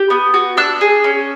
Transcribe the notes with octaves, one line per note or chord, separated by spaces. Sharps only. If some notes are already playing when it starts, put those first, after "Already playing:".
Already playing: G4
B3
F#4
D4 E6 F#6
G#4
C#4